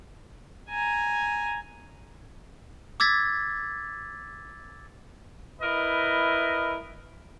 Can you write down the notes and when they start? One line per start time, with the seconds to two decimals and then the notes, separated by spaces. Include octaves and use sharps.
0.69 G#5 A#5
3.00 D6 E6 G#6 A6 B6
5.61 E4 A#4 B4 D#5